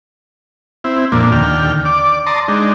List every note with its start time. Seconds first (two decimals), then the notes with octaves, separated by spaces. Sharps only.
0.84 C4 E4
1.12 F2 A#2 A#3 D4
1.32 D#2 D3 G5 F6
1.85 D5 D6
2.26 D5 A5 A#5 C6 D#6
2.48 G#3 D4 D#4